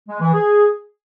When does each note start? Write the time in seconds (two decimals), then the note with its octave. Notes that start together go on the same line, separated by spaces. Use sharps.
0.08 G#3
0.20 E3
0.32 G#4